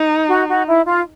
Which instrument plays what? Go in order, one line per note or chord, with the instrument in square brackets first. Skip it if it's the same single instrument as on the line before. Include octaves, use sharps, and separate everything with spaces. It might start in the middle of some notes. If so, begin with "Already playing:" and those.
Already playing: [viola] D#4
[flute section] F#4
F#4
E4
F4